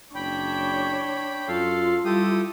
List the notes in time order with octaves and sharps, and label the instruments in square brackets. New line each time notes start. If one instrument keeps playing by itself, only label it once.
[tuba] F#1 [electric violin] D4 C#5 [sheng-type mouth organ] G5 B5
[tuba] F#2 [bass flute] F4 [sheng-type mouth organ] A4 F5
[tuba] G3 [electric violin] E4 [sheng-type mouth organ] G4 A4 D#6